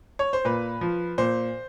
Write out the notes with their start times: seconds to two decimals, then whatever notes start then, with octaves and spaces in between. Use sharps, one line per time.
0.19 C#5
0.33 C5
0.45 A#2 B4
0.81 F3
1.18 A#2 C5